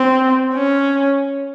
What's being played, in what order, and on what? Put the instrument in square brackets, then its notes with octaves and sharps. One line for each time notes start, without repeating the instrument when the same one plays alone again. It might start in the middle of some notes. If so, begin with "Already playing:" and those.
Already playing: [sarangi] C4
C#4